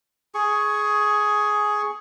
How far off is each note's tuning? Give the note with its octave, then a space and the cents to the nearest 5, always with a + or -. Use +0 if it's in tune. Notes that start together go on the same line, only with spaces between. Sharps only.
G#4 +10 C#6 +0